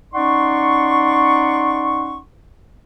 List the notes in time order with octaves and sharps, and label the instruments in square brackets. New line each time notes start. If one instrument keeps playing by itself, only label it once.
[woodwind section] C#4 D#4 D5 F#5 C6 C#6